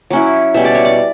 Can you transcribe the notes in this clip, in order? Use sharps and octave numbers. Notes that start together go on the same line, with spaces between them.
F#3 C#4 E4
B2 G3 C#4 E5
D5
C#5
D5